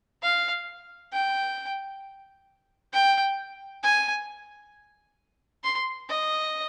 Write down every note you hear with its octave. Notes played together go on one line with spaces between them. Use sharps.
F5
G5
G5
G#5
C6
D#5